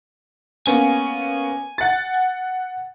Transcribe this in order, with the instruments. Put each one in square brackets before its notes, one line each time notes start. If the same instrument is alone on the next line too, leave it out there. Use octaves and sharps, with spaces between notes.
[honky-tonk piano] A#3 B3 C#4 [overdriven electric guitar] G#5
[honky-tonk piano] F#5 A6